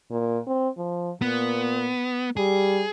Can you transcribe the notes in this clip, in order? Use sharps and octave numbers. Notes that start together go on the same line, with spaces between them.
A#2
C4
F3
A#2 B3
G3 G#4